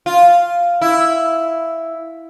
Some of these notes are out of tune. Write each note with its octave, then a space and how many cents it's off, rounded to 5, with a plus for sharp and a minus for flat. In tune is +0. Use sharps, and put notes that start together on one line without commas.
F4 -5
E4 +0